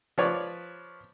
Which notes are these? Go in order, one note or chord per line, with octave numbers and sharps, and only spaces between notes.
F3 B4 C#5 D5